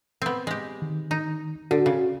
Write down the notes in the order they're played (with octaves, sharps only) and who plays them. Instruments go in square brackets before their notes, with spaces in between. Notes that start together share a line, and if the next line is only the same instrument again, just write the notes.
[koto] B3 C4
G#3 G4
[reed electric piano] D#3
[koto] D#4
[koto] D3 [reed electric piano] F#4
[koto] C#3